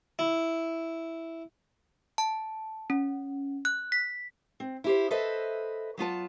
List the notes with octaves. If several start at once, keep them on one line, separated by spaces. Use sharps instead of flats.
E4
A5
C#4
F#6
B6
C4
E4 G4 C5
A4 B4 C5 D#5 E5
F#3 B3 F4 A5